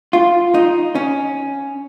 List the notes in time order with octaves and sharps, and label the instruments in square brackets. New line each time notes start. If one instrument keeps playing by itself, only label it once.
[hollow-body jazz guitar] F4
D#4
C#4